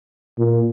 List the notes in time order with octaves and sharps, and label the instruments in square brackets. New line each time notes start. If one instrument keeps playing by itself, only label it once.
[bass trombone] A#2